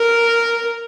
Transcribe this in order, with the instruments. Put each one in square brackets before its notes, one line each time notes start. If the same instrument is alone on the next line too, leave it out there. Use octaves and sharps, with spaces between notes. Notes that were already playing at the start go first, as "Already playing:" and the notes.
Already playing: [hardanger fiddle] A#4